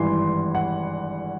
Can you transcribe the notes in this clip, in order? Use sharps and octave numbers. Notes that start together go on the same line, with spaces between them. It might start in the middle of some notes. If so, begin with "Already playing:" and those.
Already playing: G#1 G2 E3 C6
F#5